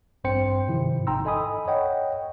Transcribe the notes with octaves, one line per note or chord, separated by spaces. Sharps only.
A1 G2 C4 C5 G5 C#7
G#2 C3 D#3 F3 E4
G#1 D#4 G5 A#5 C6 E6
A4 D#5 G#5 B5 D#6
C#5 D#5 F#5 G5